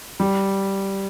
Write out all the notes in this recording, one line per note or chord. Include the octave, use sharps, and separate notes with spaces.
G3